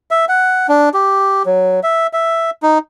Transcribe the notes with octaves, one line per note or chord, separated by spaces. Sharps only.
E5
F#5
D4
G4
F#3
E5
E5
D#4